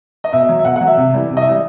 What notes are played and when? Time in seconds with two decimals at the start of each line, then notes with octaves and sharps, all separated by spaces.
0.24 D#5
0.33 B2 E5
0.49 F#3
0.59 E5
0.65 B2 F#5
0.76 F#5
0.81 F#3
0.87 E5
0.97 C3
1.14 E3 G3
1.30 C3
1.37 D#5
1.41 E5
1.47 E3 G3